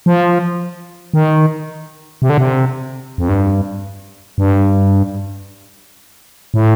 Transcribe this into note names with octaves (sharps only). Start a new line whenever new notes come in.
F3
D#3
C3
D3
C3
F2
G2
G2
A2